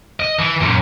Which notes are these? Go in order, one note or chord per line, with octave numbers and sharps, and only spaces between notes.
D#5
E3
F#2 A#2